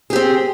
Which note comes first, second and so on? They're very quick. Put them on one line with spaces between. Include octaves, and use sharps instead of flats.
G#4 G4 C4